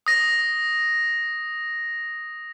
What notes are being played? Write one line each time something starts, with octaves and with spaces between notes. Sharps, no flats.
D#6 A#6